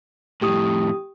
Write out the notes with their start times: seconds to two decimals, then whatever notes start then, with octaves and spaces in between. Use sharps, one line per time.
0.42 F2 A2 G4 D#6